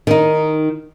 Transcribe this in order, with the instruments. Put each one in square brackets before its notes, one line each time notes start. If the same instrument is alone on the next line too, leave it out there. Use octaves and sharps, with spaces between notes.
[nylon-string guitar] D#3 D#4